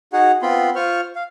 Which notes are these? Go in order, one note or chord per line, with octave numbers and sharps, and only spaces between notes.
D#4 F#4 G#4 F#5
B3 C4 F4 B5 C6
F4 C5 C#6 F6
F5